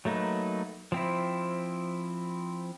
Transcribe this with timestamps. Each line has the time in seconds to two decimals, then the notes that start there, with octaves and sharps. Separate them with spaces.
0.05 F#3 A3 A#3 D#4 B4
0.92 F3 C4 E4